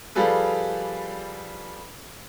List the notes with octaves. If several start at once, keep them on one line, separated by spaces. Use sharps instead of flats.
F3 G3 F4 G#4 A4 B4